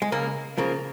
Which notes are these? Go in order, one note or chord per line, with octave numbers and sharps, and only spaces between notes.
G#3
C#2 A#3
C#3 F3 A#3